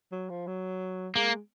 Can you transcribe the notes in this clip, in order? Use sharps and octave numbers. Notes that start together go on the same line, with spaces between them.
F#3
F3
F#3
G#3 A#3